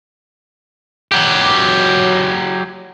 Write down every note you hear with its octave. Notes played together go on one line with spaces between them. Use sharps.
F#3 G4